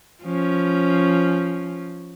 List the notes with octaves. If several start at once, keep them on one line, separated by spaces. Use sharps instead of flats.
F3 C#4